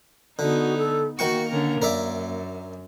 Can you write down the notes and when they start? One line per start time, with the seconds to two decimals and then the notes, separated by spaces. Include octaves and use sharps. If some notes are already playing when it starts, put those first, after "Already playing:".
0.39 D3 B3 D#4 F#4
0.78 A4
1.19 D#3 A#3 F#4 G5 C#6
1.49 D3 C#4 A#4
1.82 F#2 A#4 D5 E5